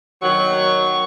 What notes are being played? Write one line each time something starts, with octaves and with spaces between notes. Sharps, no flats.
D#3 F#3 C#6